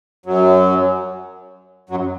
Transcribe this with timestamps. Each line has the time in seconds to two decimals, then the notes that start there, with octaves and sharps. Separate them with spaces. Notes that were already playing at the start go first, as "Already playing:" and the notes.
0.26 F#2 F#3
1.89 F#2 F#3